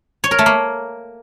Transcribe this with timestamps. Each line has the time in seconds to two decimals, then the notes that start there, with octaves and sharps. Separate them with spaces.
0.24 C#5
0.31 A#4
0.39 A3
0.46 A#3